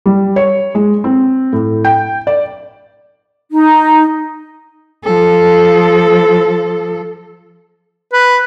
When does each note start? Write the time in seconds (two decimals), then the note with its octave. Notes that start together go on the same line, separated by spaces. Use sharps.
0.06 G3
0.36 C#5
0.75 G#3
1.04 C4
1.53 A2
1.85 G5
2.27 D5
3.52 D#4
5.04 F3 A4
8.13 B4